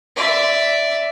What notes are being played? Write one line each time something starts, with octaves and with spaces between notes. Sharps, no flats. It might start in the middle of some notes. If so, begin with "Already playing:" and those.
D5 E5